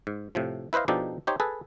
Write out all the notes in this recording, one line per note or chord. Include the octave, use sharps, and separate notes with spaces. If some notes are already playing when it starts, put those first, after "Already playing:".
G#2
A2 C3 F3
E4 B4 C5 D#5 F5
B2 F3 D4 D#4 G4 A4
D#4 G4 C5 C#5
G#4 A4 B4